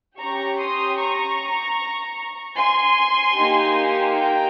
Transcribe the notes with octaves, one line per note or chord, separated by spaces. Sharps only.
C#4 G4 A#5 C#6
C6 D#6
A#5 C#6
G#5 C6
A#3 D#4 G4
G5 A#5